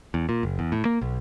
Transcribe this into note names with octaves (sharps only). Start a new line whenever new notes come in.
E2
A#2
F#1
E2
A2
A#3
B1